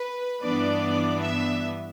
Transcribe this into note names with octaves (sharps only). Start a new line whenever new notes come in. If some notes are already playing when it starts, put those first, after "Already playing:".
Already playing: B4
G2 E3 B3 D4 D5
E5